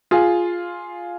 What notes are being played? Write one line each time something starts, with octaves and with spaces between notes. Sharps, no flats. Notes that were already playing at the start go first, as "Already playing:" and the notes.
F4 G#4